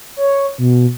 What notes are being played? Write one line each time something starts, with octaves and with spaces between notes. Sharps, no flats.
C#5
B2